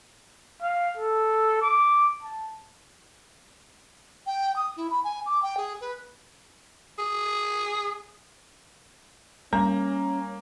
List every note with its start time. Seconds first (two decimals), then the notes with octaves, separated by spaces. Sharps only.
0.62 F5
0.98 A4
1.62 D6
2.23 A5
4.27 G5
4.56 D#6
4.77 E4
4.90 B5
5.04 G#5
5.26 D6
5.42 G5
5.57 G#4
5.81 B4
6.99 G#4
9.53 G3 A#3 C#4 A#5